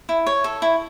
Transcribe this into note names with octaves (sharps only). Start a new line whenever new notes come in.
E4
C#5
A4
E4